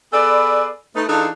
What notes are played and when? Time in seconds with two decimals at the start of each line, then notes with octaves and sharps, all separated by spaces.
0.13 B3 G#4 A4 B4 D5
0.96 A3 D#4 B4
1.09 E3 D4 D#4 F4 G#4 A4